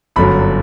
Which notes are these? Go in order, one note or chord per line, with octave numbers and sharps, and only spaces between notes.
G1 F#2 D3 F#3 B5